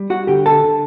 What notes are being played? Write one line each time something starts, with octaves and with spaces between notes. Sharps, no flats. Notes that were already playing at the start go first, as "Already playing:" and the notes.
Already playing: G3
F#4 F#5
D3 G4 G5
A4 A5
D3